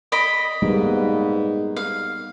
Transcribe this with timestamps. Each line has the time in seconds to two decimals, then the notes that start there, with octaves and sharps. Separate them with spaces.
0.12 D5 D#5 B5
0.62 G#2 G3 A#3 B3
1.76 F5